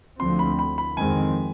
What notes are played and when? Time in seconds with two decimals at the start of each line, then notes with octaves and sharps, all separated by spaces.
0.20 D2 D3 F3 C4 C6
0.39 B5
0.59 B5
0.78 B5
0.97 F2 D#3 G#3 C4 G#5